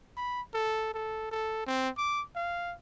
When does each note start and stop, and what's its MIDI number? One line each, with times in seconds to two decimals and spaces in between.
0.17 0.41 83
0.54 0.91 69
0.94 1.31 69
1.31 1.66 69
1.66 1.89 60
1.97 2.22 86
2.35 2.74 77